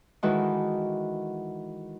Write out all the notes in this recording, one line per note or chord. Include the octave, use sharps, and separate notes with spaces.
D#3 E3 G#3 F#4 A4 B4